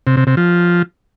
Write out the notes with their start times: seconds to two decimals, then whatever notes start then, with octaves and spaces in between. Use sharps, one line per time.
0.07 C3
0.17 C3
0.27 C3
0.37 F3